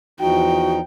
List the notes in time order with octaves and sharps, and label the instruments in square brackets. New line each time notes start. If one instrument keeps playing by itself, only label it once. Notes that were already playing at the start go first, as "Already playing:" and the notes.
[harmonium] E2 F3 D#4 [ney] F#4 [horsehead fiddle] G5